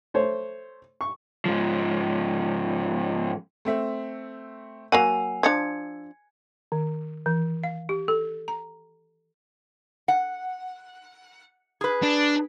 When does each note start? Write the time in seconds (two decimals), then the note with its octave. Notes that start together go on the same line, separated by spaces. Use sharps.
0.14 A3 C5 C#5
1.01 C#6
1.45 G#2 F3
3.65 A3 C4 E5
4.92 F#3 A#3 F#5 G#5 E6 C7 F7
5.43 F3 D4 G#6 C#7
6.72 D#3
7.26 E3
7.63 F5
7.89 G4
8.08 A4
8.48 A#5
10.08 F#5
11.81 G#4 B4
12.03 D4